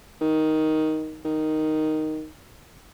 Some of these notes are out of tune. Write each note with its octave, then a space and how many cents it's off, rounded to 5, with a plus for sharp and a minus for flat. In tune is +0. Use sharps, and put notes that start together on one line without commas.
D#3 +5
D#3 +0